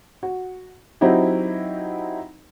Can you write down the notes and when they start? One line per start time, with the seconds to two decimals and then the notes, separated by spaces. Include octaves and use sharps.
0.23 F#4
1.01 F#3 C4 D#4 E4 F#4 G4